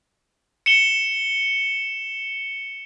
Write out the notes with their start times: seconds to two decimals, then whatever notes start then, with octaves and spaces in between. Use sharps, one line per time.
0.66 C#7 E7 G7